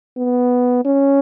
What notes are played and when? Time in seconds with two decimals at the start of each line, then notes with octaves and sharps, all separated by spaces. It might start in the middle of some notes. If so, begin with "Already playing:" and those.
0.17 B3
0.85 C#4